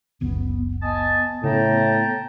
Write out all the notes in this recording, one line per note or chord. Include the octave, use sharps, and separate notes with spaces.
F#1 C#2 B3
B3 D#5 G#5 A5
A2 C#3 G5 A5 A#5